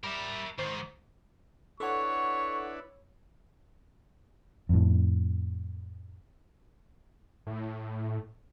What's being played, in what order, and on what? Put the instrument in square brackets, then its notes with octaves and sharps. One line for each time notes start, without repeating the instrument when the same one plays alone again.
[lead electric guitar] G3 [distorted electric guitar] A#4 E5
[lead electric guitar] G#2 [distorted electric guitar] D#3 [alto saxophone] C5
[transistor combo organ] D4 E4 B4 [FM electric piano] A4 F#5 [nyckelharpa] C#5 [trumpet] C#6
[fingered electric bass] F2 A2
[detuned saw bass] A2